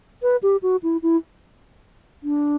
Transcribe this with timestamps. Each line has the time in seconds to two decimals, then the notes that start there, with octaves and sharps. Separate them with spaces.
0.22 B4
0.43 G4
0.62 F#4
0.83 E4
1.03 E4
2.23 D4